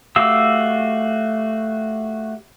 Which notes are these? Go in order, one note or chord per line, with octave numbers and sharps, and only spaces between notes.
A3 F#4 G4 F5 E6